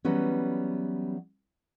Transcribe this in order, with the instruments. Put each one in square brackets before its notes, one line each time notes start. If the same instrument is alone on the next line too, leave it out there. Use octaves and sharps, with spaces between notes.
[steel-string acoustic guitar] E3 F#3 G3 B3 C#4